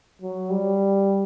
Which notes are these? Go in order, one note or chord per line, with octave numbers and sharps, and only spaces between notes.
F#3
G3